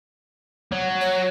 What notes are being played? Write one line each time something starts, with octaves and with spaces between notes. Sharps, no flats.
F#3
C#5